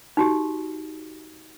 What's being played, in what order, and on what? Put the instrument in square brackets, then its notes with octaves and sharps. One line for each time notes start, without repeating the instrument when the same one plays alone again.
[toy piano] D#4 F#4 G4